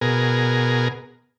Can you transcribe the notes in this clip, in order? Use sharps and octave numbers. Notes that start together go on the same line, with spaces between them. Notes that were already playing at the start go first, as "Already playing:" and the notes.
B2 G#4 A#4